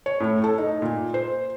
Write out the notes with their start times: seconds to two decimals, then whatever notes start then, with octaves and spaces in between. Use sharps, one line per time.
0.06 C#5
0.20 A2
0.44 A4
0.58 D#4
0.82 A#2
1.14 C5